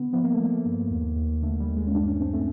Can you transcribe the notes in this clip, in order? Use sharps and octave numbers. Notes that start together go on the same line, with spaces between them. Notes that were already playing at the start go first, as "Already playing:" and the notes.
Already playing: D3 B3
F3 B3
A#3
A3
F3
A#3
G2
D#2
D#2
D3 A3
G3
D#2
G#3
C#4
G2 D4
C#4
G2 C4
A3